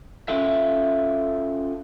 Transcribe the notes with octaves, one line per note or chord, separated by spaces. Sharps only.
C#4 F4 A4 E5